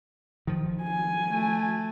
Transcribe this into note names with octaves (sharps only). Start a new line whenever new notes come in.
D#3 F3
G#5
A3